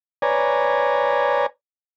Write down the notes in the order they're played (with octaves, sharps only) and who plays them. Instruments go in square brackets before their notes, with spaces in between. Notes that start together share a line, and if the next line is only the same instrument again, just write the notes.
[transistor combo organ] B4 C#5 D5 G#5 A#5